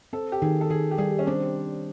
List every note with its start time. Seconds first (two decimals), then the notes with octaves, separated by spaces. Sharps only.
0.13 C4 A4
0.32 G4
0.42 D#3 G#4
0.61 A4
0.70 D#3 G#4
0.91 G4
0.98 G3 G#4
1.19 C#4
1.27 C4 D4